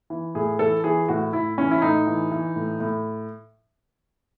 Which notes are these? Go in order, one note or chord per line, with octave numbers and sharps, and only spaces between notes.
E3
A2 G#4
E3 A4
E3 G#4
A2 F#4
A2 E4
E3 C#4
E4
A2 D#4
E3
E3
A2
A2